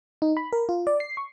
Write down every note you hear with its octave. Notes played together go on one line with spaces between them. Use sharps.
D#4
B5
A#4
F4
D5
C7
C#6